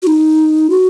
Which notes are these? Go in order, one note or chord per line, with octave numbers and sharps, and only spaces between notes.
F#4
D#4
F#4